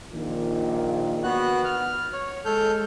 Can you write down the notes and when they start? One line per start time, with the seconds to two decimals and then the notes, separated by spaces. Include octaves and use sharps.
0.12 A#1 A#2 D#3
1.23 B3 F#4 F#6
1.65 F6
2.13 C#5
2.45 G#3 A4 F6 G6